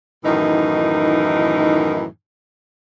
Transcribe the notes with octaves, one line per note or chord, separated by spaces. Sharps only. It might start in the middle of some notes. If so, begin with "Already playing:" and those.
F#2 A2 D#3 E3 D#4